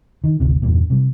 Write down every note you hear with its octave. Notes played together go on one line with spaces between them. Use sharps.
D#3
G#1 D2 C3
E2 G2 A#2
C3 G3